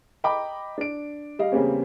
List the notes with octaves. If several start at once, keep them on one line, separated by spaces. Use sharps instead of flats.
D#5 G5 A#5 B5 D6
D4 D7
G3 D#5 F5
E2 C#3 G3 A#3 C4 C#4